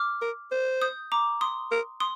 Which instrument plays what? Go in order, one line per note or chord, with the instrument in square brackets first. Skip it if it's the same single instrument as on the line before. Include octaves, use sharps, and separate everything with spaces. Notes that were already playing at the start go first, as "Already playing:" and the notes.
Already playing: [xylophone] D6 F6
[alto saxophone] A#4
C5
[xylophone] D#6 G6
A#5 D6
C6 D#6
[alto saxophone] A#4
[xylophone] C6 D#6